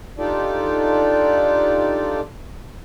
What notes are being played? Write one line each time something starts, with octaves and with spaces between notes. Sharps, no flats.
D4 D#4 F4 G4 A4 D5